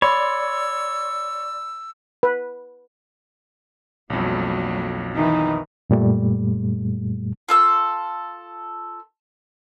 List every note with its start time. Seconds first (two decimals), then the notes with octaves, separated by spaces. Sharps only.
0.02 C#5 D5 B5 C6 E6
2.23 B4
4.10 B1 F2 F#3 G3 A#3
5.14 D#3 E3 D#4
5.90 F#2 A#2 G3 A3
7.49 F4 A4 E6